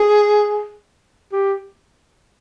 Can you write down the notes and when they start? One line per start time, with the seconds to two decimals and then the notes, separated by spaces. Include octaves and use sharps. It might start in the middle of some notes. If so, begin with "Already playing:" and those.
Already playing: G#4
1.32 G4